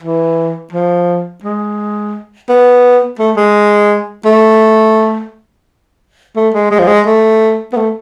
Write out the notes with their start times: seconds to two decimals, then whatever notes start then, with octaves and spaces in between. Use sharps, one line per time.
0.02 E3
0.73 F3
1.44 G#3
2.49 B3
3.19 A3
3.37 G#3
4.25 A3
6.36 A3
6.54 G#3
6.71 G#3
6.79 F3
6.87 G#3
7.06 A3
7.73 B3
7.76 A3